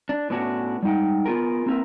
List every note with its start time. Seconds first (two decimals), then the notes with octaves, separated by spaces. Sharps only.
0.09 D4
0.30 A2 B3 C#4 D4 E4 F#4
0.83 G3 G#3 D#4 F#5 G5
1.25 B3 F4 G#4 A#4
1.66 A#3 C4 E4 G4 A#4 B4